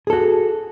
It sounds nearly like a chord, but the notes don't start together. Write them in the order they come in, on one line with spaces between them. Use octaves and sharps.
G#4 A4 F#4